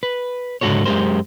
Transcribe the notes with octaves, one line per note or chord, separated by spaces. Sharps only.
B4
C#2 G#2 D3 F#4 A4 C#5
F#2 G#3 C#4 G4 A#4 C5